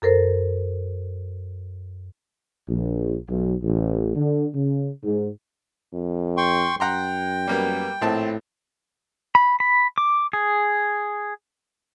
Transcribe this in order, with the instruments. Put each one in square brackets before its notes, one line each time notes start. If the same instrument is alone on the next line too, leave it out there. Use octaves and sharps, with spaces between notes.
[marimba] F#2 A4 A#4 C5
[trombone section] A#1
B1
A1
D3
C#3
G#2
[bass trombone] F2
[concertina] G5 C6 C#6
[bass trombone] F#2 [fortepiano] F#5 A#5 C6 [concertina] G5
[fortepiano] G3 A#3 B3
[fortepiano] A#1 C4 A5 [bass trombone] A2
[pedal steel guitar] B5
B5
D6
G#4